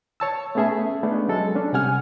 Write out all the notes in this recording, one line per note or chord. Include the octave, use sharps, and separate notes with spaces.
C#5 A5 E6
A3 B3 C#4 G#4 E5 A5
G#3 A3 B3 C#4 D4
F#3 G#3 A4
C#4 D4
C3 G3 F#5 G#5 F6